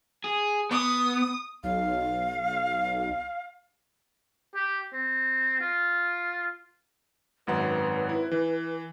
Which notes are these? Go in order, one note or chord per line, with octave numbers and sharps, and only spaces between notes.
G#4
B3 D#6
B1 F5
G4
C4
F4
G#1 F#2 B4 F#5
E4
E3